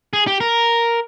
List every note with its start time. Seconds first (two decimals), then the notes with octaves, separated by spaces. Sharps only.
0.13 G#4
0.27 G4
0.40 A#4